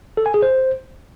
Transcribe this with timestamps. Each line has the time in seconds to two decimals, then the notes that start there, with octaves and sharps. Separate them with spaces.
0.17 A4
0.26 G#5
0.34 G#4
0.42 C5